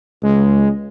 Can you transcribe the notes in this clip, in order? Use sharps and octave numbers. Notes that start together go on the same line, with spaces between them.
C#2 G#3